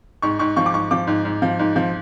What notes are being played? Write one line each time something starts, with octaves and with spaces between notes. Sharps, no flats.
G#2 C#6
G#2 C#6
F3 C#6
D6
G#2 C#6
F3 D6
G#2
G#2
F3
G#2
F3